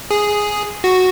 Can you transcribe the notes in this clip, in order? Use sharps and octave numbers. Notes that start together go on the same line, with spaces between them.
G#4
F#4